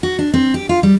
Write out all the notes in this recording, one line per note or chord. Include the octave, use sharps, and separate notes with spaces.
F#4
D4
C4
G4
F4
G3